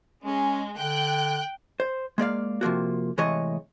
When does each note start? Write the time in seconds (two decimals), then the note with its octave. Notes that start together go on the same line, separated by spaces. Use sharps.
0.24 G#3 C#4
0.78 D3 G5 F#6
1.80 C5
2.18 G#3 A#3 D5 F5
2.61 C3 F3 A#3 F#4
3.18 A2 C3 E3 G#3 C#5 D#5